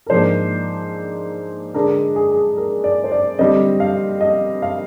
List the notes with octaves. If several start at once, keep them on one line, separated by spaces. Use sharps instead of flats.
A#4
G#2 F3 A#3 D4 C5
D3 G#3 D4 A#4
G#4
G#4
A#4
D5
C5
D5
D3 G3 C4 D#5
F5
D#5
F5